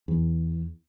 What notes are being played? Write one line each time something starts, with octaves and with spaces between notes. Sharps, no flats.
E2